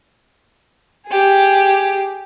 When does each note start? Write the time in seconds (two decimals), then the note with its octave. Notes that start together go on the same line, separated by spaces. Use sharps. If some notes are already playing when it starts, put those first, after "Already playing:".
1.07 G4 G#4